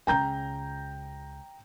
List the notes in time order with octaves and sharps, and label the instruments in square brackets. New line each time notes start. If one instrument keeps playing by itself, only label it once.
[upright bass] C#2 C#3 [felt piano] G5 A#5 G6